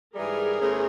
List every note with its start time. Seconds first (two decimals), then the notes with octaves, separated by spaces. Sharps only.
0.15 G#2 E3 G3 G#4 A#4
0.61 E2 C3 E3 A3 C#4